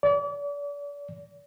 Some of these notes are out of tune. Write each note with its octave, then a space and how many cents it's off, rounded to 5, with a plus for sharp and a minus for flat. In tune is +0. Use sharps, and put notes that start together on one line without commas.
D5 -35